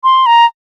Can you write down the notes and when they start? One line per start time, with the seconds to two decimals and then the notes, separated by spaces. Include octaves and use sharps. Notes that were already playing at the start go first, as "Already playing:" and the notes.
0.04 C6
0.26 A#5